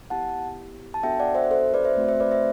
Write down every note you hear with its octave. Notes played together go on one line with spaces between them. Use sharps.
B3 E4 G4 F#5 A5
A5
B3 D4 F#4 A4 E5 G5
D5 F#5
C5 E5
A4 C5
B4 D5
C5 E5
A3 C4 F#4
C5 E5
B4 D5
C5 E5